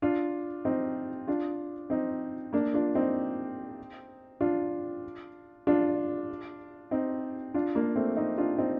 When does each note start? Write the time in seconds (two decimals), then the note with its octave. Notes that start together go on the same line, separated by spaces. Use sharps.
0.02 D4 F4
0.65 C4 D#4
1.27 D4 F4
1.90 C4 D#4
2.53 A#3 D4
2.74 D4 F4
2.95 C4 D#4
4.41 D4 F4
5.67 D4 F4
6.91 C4 D#4
7.54 D4 F4
7.75 A#3 D4
7.96 A3 C4
8.16 C4 D#4
8.38 D4 F4
8.58 C4 D#4